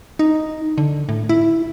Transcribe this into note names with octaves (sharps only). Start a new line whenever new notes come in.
D#4
D3
A2
E4